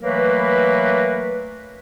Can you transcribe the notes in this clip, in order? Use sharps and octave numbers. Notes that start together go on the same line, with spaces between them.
E3 F#3 A3 A#3 A#4 B4